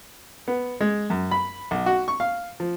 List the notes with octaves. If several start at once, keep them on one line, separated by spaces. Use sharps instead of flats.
B3
G#3
F#2
B5
B1
F#4
C#6
F5
F3